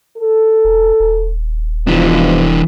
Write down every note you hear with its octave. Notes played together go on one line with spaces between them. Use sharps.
A4
E1
D#1
G#2 B2 E3 F3 D4